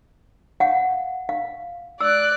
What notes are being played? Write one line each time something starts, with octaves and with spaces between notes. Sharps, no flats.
F5 F#5
F5
D5 E6 F#6